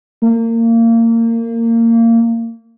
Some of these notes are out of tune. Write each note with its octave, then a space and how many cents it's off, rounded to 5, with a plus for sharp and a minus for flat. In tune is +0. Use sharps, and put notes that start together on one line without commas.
A#3 -25